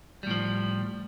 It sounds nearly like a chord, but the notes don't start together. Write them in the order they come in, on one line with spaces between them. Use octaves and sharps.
G3 A2 F3